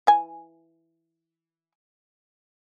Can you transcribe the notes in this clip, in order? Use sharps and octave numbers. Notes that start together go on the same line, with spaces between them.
E3 G#5